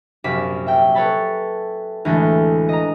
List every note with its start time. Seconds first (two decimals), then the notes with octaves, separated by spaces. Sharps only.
0.24 A#1 F#2 C3 D6 B6 E7
0.67 E5 G5
0.95 A4 B4 C#5 A5 B5
2.05 D2 A2 E3 G#3 A4 G6
2.69 D#5 A#5